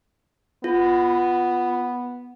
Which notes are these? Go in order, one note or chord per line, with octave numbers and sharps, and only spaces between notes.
B3 F4